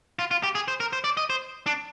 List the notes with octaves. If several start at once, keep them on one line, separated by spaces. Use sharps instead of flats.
F4
F4
G4
G#4
C5
A#4
C5
D5
D#5
C5
D4